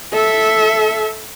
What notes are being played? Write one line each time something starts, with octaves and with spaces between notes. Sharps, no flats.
A4 E5